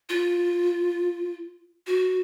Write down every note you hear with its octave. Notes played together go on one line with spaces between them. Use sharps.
F4
F#4